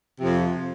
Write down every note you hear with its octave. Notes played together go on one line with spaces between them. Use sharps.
F2 C3 F3